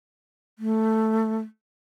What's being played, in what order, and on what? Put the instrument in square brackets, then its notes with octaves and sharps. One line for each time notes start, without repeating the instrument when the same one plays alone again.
[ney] A3